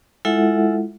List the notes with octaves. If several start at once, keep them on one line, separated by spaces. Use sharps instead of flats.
G#3 E4 F4 A4 E5 F#5